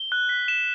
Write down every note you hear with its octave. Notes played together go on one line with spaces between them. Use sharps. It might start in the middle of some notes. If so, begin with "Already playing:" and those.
Already playing: G7
F#6
B6
E7